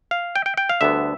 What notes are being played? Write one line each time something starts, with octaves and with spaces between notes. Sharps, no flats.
F5
G5
G5
G5
F5
D2 D3 G3 B3 E5